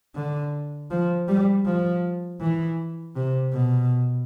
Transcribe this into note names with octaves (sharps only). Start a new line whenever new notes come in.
D3
F3
G3
F3
E3
C3
B2